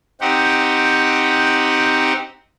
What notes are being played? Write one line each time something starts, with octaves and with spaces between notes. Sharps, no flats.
C4 D#4 G4 F#5